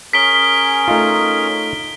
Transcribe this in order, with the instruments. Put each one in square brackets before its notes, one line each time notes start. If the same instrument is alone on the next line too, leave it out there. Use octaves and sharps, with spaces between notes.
[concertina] C#4 G#4 A#4 [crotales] B6 D7 G7
[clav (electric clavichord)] A3 D#4 F4